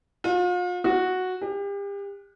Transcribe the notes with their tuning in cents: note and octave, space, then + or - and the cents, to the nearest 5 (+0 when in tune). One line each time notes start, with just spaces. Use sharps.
F4 +40
F#4 -5
G4 +35